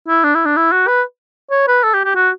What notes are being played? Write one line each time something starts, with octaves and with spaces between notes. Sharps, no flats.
E4
D4
E4
D4
E4
F#4
B4
C#5
B4
A4
G4
G4
F#4